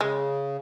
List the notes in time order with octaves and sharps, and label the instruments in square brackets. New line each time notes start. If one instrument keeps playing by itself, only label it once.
[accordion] C#3 [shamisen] G#3